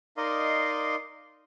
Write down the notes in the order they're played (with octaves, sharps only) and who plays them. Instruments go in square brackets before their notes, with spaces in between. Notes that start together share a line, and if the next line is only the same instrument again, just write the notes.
[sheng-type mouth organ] D#4 A#4 D5 D#5 F5 C6